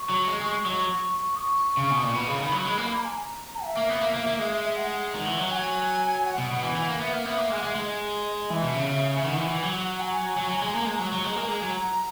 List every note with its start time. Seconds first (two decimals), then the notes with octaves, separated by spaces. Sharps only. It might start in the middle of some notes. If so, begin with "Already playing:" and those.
Already playing: C#6
0.10 F#3
0.28 G#3
0.41 G#3
0.65 F#3 C#6
1.36 D#6
1.40 C#6
1.77 C#3
1.91 B2
2.03 A#2
2.14 B2 B5
2.27 C#3
2.39 D#3
2.52 F#3
2.65 G#3
2.78 A#3
2.90 B5
2.97 A#5
3.04 G#5
3.12 A#5
3.64 E5
3.77 A#3
3.89 B3
4.01 A#3
4.14 A#3
4.27 A#3
4.39 G#3 E5
4.51 E5
4.64 E5
4.77 F#5
5.14 D#3
5.26 E3
5.39 F#3
5.45 F#5
5.51 G#5
6.26 F#5
6.38 B2
6.51 B2
6.63 E3
6.76 E3
6.88 A#3
7.01 B3 E5
7.13 A#3 F#5
7.25 B3 E5
7.38 A#3
7.50 G#3 G#5
7.59 F#5
7.63 G#3
7.68 E5
7.75 G#3 D#5
8.50 E3 E5
8.63 B2
8.75 C#3
9.17 C#3
9.24 D#3 F#5
9.37 E3
9.50 E3
9.63 F#3
10.00 G#5
10.37 F#3
10.49 F#3
10.62 G#3
10.74 A#3 A#5
10.85 G#3 G#5
10.94 F#3 A#5
11.12 F#3
11.25 G#3
11.36 A#3
11.48 G#3 A#5
11.62 F#3